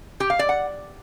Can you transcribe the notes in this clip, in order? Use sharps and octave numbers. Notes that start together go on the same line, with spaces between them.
G4
F5
D5
F#5